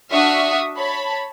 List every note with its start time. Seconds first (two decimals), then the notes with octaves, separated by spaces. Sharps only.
0.11 D4 F#4 E5 C#6 D#6 F6
0.77 C#5 A5 B5